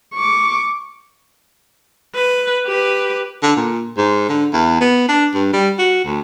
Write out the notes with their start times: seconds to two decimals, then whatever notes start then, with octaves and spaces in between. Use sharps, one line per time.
0.14 C#6 D6
2.14 B4
2.66 G4 B4
3.43 D3
3.57 A#2
3.97 G#2
4.29 D3
4.53 E2
4.81 B3
5.09 D4
5.34 G2
5.53 G3
5.79 F#4
6.05 D2